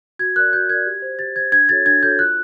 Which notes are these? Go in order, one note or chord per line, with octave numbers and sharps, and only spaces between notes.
F#4 G#6
A#4 D5 F#6
F#4 G6
A#4 D5 G#6
G4
C5
G4 A6
C5 G#6
D4 G#6
F#4 A4 C#5 A6
D4 G#6
F#4 A4 C#5 G6
F4 F#6